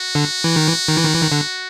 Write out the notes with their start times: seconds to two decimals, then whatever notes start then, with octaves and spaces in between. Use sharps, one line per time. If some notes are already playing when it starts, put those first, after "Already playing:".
Already playing: F#4
0.15 D3
0.44 E3
0.56 D#3
0.67 E3
0.88 D#3
0.97 E3
1.05 D#3
1.14 E3
1.22 D#3
1.32 D3